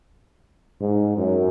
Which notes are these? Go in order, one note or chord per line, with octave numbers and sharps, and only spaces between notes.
G#2
F#2